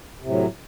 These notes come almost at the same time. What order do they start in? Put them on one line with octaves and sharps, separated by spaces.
C3 A2 F#3